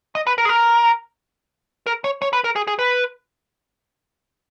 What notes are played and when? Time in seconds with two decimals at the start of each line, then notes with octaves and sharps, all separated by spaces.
0.15 D#5
0.27 B4
0.38 A#4
0.45 G#4
0.49 A#4
1.87 A#4
2.04 C#5
2.22 C#5
2.33 B4
2.44 A#4
2.56 G#4
2.67 G#4
2.79 B4